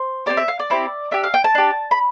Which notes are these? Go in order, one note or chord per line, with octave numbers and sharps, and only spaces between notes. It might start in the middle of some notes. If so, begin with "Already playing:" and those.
Already playing: C5
C4 E4 G4 D5
E5
F5
D5
C4 E4 G4
D4 G4 E5
F5
G5
A5
D4 G4
B5